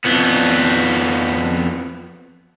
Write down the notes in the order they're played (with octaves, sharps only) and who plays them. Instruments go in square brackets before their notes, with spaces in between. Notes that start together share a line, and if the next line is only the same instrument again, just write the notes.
[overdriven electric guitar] F2 B3